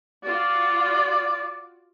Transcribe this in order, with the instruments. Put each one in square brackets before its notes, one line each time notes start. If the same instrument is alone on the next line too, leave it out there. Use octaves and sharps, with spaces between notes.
[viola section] F4 F#4 [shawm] D5